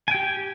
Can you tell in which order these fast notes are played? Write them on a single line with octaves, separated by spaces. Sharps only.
G#5 G5 G4